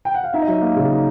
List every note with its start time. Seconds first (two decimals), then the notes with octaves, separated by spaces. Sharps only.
0.05 G5
0.14 F#5
0.24 F5
0.34 D#4 E5
0.42 D#5
0.47 F#3 E5
0.62 A#3 F5
0.76 C#3
0.90 D#4